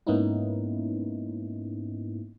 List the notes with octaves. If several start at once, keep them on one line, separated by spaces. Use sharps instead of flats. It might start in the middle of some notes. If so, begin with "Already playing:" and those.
G#2 A#3 B3 C#4 D#4 E4